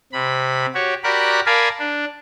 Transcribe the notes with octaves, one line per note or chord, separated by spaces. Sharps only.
C3 B5
F#4 G4 C#5
F#4 G4 A#4 D5 B5 F#6
A#4 D5 F5 G#5 A5 B5
D4